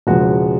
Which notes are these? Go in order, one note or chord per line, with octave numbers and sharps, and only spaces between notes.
E1 E2 C#3 F3 G#3 F#4 G#4